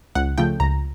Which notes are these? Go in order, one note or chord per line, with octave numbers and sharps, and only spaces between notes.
C#2 F#5
C#3 F3 A3 G5
C#2 A#5